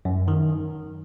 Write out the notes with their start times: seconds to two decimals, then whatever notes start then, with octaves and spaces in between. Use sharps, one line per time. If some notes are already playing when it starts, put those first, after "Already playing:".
0.05 F#2
0.28 D#3